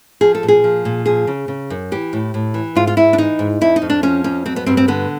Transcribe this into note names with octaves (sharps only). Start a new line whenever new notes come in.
F3 G#4
A4
A#2
G#4
F3
A#2
F3 G#4
C#3
C#3
F#2
E3 G4
A2
A2
E3
G#2 F4
F4
G#2 E4
D4
E3 D#4
G#2
F2 E4
D#4
F2
D4
F3 C#4
F2 C#4
F#3 C4
B3
G2 C4
C4
D3 B3